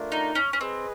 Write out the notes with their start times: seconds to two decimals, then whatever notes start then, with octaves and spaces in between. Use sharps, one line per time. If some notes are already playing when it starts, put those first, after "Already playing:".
Already playing: A3 D4 F4 A#4
0.12 D#4
0.35 C#4
0.53 C#4
0.61 C4 G#4 B4 D#5